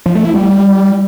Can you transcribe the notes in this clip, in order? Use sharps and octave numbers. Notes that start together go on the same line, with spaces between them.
F3
A3
E4
G3